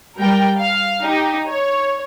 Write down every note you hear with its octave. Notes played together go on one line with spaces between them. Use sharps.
G3 A#4 G5
F5
D#4 G4
C#5